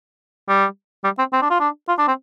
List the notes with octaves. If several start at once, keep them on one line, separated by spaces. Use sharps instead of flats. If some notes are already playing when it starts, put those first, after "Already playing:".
G3
G3
C4
C4
D4
F4
D4
F4
D4
C4